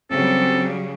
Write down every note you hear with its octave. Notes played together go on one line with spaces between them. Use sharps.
C#3 F#3 G3 C4 A4